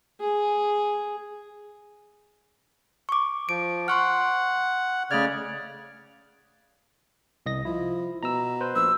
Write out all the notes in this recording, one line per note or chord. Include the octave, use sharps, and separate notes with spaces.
G#4
C#6 D6
F3 D7
F#5 C6 C#6 F6
C#3 A3 D5 F6 G#6
C2 D#5 A#6
F3 E4
B2 A#5 E6
B4 C5
A#1 E6